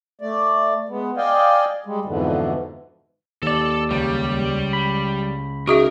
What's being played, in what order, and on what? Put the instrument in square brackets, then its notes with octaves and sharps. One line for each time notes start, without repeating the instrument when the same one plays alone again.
[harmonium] A3 D5
G#3 B3
D5 D#5 F5 G5 G#5
G3 G#3
F2 G#2 B2 D3 E3
[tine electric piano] D#2 D5 [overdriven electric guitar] A4 A5
[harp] C#2 [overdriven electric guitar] G3
[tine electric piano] B5
[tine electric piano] C#3 D#4 [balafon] F#4 G#4 E5 [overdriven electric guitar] A#4